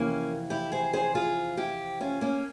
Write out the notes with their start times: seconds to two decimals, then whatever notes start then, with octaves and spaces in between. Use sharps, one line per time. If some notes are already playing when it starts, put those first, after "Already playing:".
Already playing: F2 C3 E3 A#3 C#4
0.50 E4 G4
0.72 G#4 C5
0.93 G#4 C5
1.15 F4 G#4
1.57 E4 G4
2.01 C#4 F4
2.21 A#3 C#4